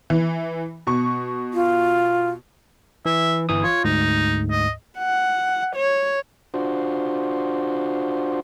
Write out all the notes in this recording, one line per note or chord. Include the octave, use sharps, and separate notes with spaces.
E3
B2 C#6
F4
E3 E5
G1 E3 D#6
F4 C#5
D2 G#2 D#4
D#5
F#5
C#5
D4 F4 F#4 C5